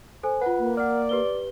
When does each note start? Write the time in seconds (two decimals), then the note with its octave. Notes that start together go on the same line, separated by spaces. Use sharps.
0.23 A4 C5 G#5
0.42 F4 B4 F#5
0.59 A#3
0.77 D5 F#5 F6
1.09 G4 B4 G7